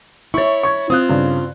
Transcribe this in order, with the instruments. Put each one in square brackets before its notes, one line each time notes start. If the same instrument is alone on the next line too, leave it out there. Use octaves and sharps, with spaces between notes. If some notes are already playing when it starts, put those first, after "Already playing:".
[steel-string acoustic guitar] E4 C#5 [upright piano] C#6 A6
[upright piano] C#6 G#6
[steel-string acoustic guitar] C4 F4 [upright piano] D#6 F#6
[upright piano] G2 C#3